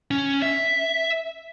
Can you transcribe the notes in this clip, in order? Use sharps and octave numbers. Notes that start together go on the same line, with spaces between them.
C#4
E5